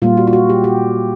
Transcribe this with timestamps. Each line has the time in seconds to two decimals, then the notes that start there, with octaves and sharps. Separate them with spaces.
0.02 A#2 G3 A#3 F4
0.17 F#4
0.27 F4
0.33 F#4
0.49 G4
0.64 G4